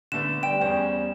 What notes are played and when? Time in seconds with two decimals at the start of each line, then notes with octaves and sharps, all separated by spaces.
0.12 D3 A3 B3 E7
0.43 G3 G5 E7
0.61 E2 C#4 C5